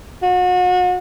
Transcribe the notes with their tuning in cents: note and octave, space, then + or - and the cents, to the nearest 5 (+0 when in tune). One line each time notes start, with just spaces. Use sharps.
F#4 -35